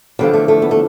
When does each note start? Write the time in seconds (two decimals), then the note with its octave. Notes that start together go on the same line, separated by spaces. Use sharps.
0.19 E2 D3 F3 G3
0.33 A3
0.48 A3
0.62 B3
0.71 A3